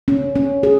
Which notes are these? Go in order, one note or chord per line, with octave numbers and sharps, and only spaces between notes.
C#4
C#4
G#4